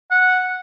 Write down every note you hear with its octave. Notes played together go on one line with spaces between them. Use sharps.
F#5